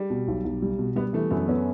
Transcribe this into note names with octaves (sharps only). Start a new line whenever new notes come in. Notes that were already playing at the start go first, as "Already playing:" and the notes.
Already playing: G3
B2
B1
B1
G3
B2
G3 B3
E3 A3
F#2 B3
B3 C#4